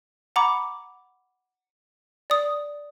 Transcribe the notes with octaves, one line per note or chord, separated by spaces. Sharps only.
F#5 A#5 B5 D6
D5 D#6